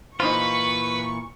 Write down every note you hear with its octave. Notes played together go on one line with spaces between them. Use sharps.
A#2 E3 D#4 F4 B4 C5 C#6